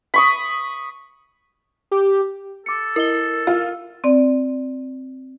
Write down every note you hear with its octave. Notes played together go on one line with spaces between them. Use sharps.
B5 C#6 D#6
G4
A4 D6 C#7
E4 A#4 D#5 G7
F4
C4 D5